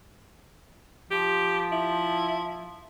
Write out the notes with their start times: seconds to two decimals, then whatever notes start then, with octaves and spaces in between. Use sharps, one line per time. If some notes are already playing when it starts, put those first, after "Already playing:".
1.11 F3 G4
1.72 E4